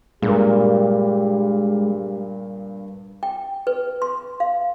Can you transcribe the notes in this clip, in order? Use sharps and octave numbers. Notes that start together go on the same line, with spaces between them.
G2 A#2 G#3 A#3 G4
G5
B4
C6
F5